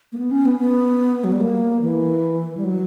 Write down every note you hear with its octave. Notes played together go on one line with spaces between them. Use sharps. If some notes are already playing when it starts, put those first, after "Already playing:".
A#3
B3
C#4
B3
B3
F#3
G3
A#3
E3
G3
F#3